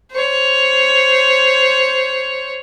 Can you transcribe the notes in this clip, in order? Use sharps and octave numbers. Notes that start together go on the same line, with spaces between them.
C5 C#5